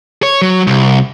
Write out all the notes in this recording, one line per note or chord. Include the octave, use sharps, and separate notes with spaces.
C#5
F#3
C2